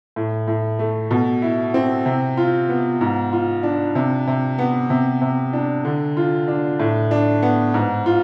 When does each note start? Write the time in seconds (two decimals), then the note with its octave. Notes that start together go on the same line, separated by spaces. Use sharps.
0.16 A2
0.48 A2
0.79 A3
1.11 B2
1.42 E4
1.74 C4
2.06 C3
2.37 F4
2.69 B3
3.01 G#2
3.32 F4
3.63 D4
3.95 C3
4.27 C3
4.58 B3
4.90 C3
5.21 C3
5.53 D4
5.85 D3
6.17 F4
6.48 D4
6.79 A2
7.11 D4
7.42 B3
7.74 G#2
8.06 F4